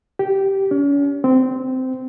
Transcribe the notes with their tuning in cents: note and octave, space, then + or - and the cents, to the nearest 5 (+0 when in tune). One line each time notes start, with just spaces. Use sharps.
G4 -10
C#4 +40
C4 -15